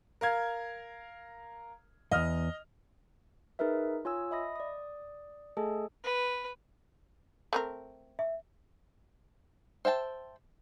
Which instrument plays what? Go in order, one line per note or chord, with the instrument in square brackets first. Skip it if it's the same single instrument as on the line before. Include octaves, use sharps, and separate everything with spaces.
[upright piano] A#4 F5 G#6
[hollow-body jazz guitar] E2 G2 [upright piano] D#5 D#6 F6
[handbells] D#4 G#4 A#4 B4 E5
F4 C#5 G#5 D#6 E6
D#5 E5 B5 D#6 A#6
D5 D#6
A3 G#4 A4 D#5 G#5 A5
[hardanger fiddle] B4
[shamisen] A3 C4 A#4
[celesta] E5
[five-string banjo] C5 E5 G5 A5